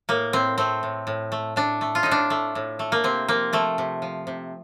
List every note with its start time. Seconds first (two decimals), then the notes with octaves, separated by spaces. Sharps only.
0.09 A2 A#3
0.33 A2 C4
0.58 A3 C4
0.83 A2
1.07 A2
1.32 A3
1.56 A3 D4
1.81 A3
1.95 F4
2.03 A2 D#4
2.11 D4
2.30 A3
2.55 A2
2.79 A3
2.92 A#3
3.04 C3 C4
3.28 F3 A#3
3.53 F3 A3
3.78 C3
4.02 F3
4.27 C3